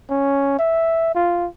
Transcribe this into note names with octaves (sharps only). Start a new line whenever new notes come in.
C#4
E5
F4